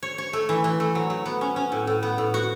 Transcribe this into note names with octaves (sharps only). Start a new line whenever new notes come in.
C#5
C#5
A3
E3
E3
A3
F#3
F#3
B3
C#4
C#4
A2
A2
B3
A2
F#4